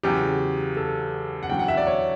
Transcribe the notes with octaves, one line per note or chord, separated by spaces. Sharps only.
E2 C#3 F#3 G4
A4
F#5
E2 D3 F#3 G5
F#5
E5
D5
C#5